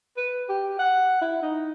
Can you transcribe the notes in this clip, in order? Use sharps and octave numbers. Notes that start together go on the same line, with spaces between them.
B4
G4
F#5
E4
D#4